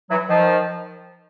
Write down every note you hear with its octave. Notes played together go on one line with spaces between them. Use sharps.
E3 F#3
D#3 F3